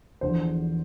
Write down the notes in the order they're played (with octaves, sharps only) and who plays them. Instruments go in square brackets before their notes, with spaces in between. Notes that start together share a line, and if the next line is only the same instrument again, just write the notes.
[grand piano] E1 E2 D3 F3 C5